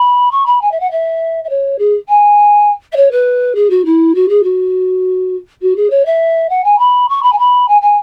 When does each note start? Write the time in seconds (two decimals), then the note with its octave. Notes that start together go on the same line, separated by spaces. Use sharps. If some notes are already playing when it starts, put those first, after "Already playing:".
Already playing: B5
0.31 C#6
0.46 B5
0.61 G#5
0.71 E5
0.80 F#5
0.91 E5
1.44 E5
1.49 C#5
1.78 G#4
2.08 G#5
2.92 E5
2.96 C#5
3.11 B4
3.55 G#4
3.70 F#4
3.85 E4
4.15 F#4
4.29 G#4
4.43 F#4
5.62 F#4
5.76 G#4
5.90 C#5
6.05 E5
6.49 F#5
6.64 G#5
6.78 B5
7.09 C#6
7.22 B5
7.32 G#5
7.38 B5
7.68 G#5
7.81 G#5